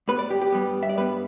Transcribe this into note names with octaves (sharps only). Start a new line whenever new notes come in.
G2 G3 B3 B4
D5
G4
G4
G2 G3 B3
E5
D5
G2 G3 B3 B4